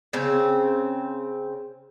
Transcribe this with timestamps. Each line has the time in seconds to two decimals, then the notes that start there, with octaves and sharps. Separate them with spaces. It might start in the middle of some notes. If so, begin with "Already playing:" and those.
0.13 C#3 C4